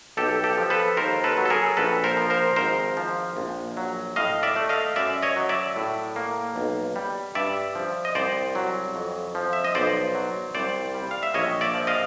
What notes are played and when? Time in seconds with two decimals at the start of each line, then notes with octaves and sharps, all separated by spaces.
0.17 B1 G4 A4
0.44 G4 A4
0.58 F3
0.70 A4 B4
0.97 D#2 A#4 C5
1.24 A4 B4
1.37 F#3
1.45 A4
1.50 G#4 A#4
1.77 A#1 A4 B4
2.04 A#4 C5
2.17 F3
2.30 A#4 C5
2.56 G#1 A#4 C5
2.97 F3
3.37 A#1
3.77 F#3
4.16 A2 D#5 F5
4.43 D5 E5
4.56 A3
4.69 D#5 F5
4.96 F#2 D5 E5
5.22 C#5 D#5
5.36 F#3
5.49 D5 E5
5.76 A2
6.16 A#3
6.56 B1
6.96 G3
7.35 G2 D5 E5
7.75 F3
8.05 D#5
8.15 C2 C5 D5
8.55 F#3
8.95 F2
9.35 F3
9.53 E5
9.64 D#5
9.75 B1 C5 D5
10.15 F#3
10.55 C2 C5 D5
10.94 G3
11.11 F5
11.23 E5
11.34 A#1 C#5 D#5
11.61 D5 E5
11.74 F3
11.87 D#5 F5